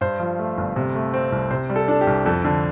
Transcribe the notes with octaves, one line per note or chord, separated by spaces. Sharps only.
G2 C5
F3
A3
G1
C3
A3
C4
C2
C3 C5
G3
A4
D4 A4
G4
C2
F2 A4
D3